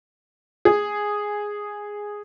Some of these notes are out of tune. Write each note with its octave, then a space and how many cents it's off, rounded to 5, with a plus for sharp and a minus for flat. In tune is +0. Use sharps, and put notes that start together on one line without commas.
G#4 -5